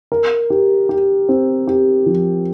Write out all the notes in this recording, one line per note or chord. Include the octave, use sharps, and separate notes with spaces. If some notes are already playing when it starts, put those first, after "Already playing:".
A#4
G4
G4
C4
G4
F3